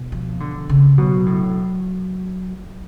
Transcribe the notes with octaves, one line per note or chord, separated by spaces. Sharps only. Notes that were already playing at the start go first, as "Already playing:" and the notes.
Already playing: B2
F3
D3
C#3
B2 F#3
A2